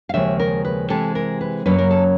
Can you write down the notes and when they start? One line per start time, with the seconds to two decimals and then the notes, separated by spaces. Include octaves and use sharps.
0.09 F5
0.14 D#2 C#3 F3 G#3 E5
0.40 A#4
0.65 B4
0.89 C3 E3 G#3 C4 A4
1.15 A#4
1.41 B4
1.66 F#2 C#3 F#3 A#3 C#4 B4
1.79 A#4
1.91 A4